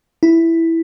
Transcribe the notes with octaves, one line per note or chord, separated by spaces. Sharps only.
E4